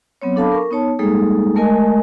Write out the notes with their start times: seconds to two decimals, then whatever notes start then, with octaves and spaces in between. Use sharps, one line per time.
0.22 F#3 B3 C4 C#5
0.36 D4 A4 F5 A5 B5 D6
0.52 A#4 C#6
0.71 B3 D#4 C#5 A5
0.99 G3 G#3 A#3 D#4 G#4 A4
1.56 G#3 A3 A#4 D#5 G#5